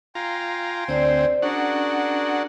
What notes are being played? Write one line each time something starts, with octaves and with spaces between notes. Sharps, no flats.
F4 G5 G#5 A#5 C6
D2 C4 C5 D5
C#4 D4 F#4 G#4 A#4 F#5